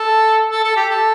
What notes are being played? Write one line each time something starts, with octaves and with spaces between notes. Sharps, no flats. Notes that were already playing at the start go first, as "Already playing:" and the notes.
Already playing: A4
A4
A4
G4
A4